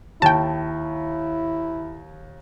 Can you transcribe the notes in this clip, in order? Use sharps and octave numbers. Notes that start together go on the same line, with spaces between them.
D#2 E4 G5 A5